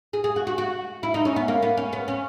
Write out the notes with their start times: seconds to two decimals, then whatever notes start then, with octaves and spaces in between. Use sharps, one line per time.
0.13 G#4
0.24 G#4
0.36 F#4
0.47 F#4
0.58 F#4
1.03 E4
1.14 D#4
1.25 C#4
1.36 B3
1.48 A#3
1.62 B3
1.77 C#4
1.93 B3
2.08 C#4